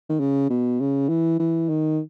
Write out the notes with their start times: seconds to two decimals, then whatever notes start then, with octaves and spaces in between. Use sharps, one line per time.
0.09 D#3
0.20 C#3
0.50 B2
0.80 C#3
1.09 E3
1.40 E3
1.69 D#3